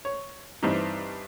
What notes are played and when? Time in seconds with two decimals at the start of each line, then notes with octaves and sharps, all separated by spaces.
0.05 C#5
0.63 G2 E3 C4 D#4